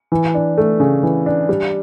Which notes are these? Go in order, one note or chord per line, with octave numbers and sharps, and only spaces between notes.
E3
D4
A3
C#3
E3
D4
G3